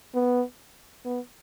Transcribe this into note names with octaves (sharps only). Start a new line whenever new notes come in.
B3
B3